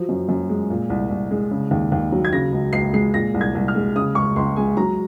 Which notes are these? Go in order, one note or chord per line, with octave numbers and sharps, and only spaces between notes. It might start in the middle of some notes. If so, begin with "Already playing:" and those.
Already playing: F3 F#3
F#2
F#2
G#3
A#2
C2
C2
G#3
C#3
D#2
D#2
F#3
G#6
C#3 A#6
C#2
C#2 C7
G#3 C7
A#2 A#6
C2
G#6
C2
F6
G#3
C#3 D#6
C#2 C#6
C#2 C6
G#3 G#5
F#3 A#5